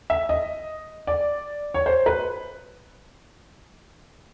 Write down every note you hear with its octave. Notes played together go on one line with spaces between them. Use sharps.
E5
D#5
D5
C#5
C5
B4